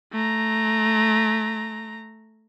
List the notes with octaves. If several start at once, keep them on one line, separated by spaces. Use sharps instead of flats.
A3 A#5